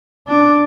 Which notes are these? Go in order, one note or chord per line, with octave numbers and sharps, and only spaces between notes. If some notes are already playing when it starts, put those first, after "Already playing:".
D4